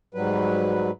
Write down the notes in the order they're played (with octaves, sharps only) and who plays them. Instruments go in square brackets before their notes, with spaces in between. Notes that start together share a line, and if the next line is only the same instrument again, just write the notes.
[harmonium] G#2 F#3 G3 B4